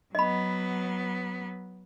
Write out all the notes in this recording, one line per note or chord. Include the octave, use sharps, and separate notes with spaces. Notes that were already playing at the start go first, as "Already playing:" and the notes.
F#3 B3 D#5 B5